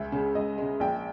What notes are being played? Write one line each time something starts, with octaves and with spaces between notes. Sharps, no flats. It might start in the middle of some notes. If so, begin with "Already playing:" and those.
Already playing: C#2 E5
C#3 G#3
C#2 D#5
C#3 G#3
A#1 G5